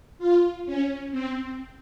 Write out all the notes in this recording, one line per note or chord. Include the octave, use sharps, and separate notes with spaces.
F4
C#4
C4